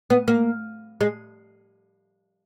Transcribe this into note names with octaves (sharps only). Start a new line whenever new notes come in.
B3
A#3
G#3